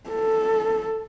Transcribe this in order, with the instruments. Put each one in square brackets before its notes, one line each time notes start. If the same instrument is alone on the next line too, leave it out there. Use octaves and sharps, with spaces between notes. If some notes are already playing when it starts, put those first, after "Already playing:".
[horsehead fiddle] A4